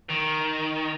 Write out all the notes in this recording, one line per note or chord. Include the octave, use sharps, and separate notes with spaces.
D#3